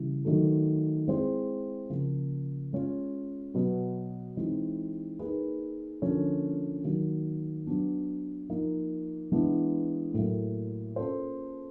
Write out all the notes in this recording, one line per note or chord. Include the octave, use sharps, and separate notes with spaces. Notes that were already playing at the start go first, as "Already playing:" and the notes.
Already playing: C#3 E3 G3
D#3 F#3 A3
G#3 C4 E4 G#4 C5
C#3 F3 A#3
G#3 C#4 F4
B2 F#3 B3
E3 G#3 C4 D#4
A#3 D#4 G#4 B4
D3 F3 A#3 C#4
D#3 F#3 A#3
F#3 B3 D4
F3 A#3 D#4
E3 G#3 B3 D4
A2 F#3 A#3
A#3 C#4 F4 A4 C5